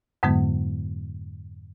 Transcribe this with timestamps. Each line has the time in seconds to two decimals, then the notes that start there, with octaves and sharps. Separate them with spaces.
0.23 F2 G#2 D3 F#3 G#3 B3